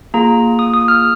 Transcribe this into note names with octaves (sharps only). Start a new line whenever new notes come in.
A#3 F4 G#4 A#5
D#6
D#6
F6